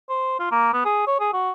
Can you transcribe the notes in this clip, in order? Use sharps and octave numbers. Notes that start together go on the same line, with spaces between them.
C5
F4
A#3
B3
G#4
C#5
G#4
F#4